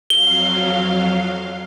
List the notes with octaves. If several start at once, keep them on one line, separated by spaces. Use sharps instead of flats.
F2 F#3 F5 G7